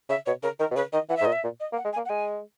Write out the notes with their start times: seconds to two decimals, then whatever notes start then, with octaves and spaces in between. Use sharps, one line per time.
0.09 C#3 E5
0.26 B2 C#5
0.43 C#3 A#4
0.59 D#3 A#4
0.71 B2
0.76 C#3 B4
0.93 D#3 D#5
1.09 E3 F#5
1.17 E5
1.21 G#2
1.25 A#2 D#5
1.32 E5
1.44 A#2
1.60 D#5
1.72 A#3
1.77 F#5
1.85 G#3
1.93 G#5
1.97 A#3
2.06 F#5
2.09 G#3 G#5